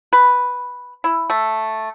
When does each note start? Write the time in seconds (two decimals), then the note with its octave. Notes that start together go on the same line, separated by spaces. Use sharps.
0.13 B4
1.04 E4
1.30 A3